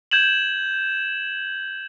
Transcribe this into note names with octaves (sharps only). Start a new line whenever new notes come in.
G6 G#6 E7 F#7